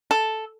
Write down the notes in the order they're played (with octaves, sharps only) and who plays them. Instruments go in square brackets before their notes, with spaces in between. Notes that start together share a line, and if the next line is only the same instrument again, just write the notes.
[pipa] A4